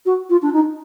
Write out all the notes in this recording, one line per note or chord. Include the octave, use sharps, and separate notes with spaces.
F#4
F4
D4
D#4